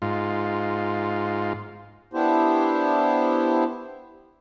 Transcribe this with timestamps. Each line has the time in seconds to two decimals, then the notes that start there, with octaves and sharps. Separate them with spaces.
0.02 G#2 F4
2.13 B3 D4 E4 G4 C5